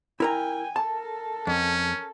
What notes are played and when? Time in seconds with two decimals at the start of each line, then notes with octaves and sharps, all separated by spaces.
0.20 E4 A#4 G5 G#5 A#5
0.76 A4 A#4 A5
1.47 F2 C#4